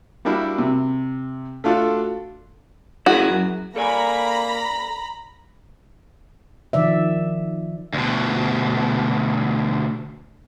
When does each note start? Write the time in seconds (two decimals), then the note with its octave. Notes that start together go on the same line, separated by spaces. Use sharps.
0.25 G3 A#3 D4 E4 F#4
0.58 C3
1.64 A3 D4 F4 F#4 A4
3.06 E4 F#4 G#4 A#4
3.29 F#2
3.76 A#3 A4 D5 G#5 A#5 B5
6.73 D#3 F3 D5 E5
7.93 D2 B2